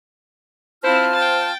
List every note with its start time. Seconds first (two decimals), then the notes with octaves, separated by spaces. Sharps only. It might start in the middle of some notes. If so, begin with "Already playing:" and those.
0.84 C4 E4 F4 C5 A5 F6
1.15 G5 A6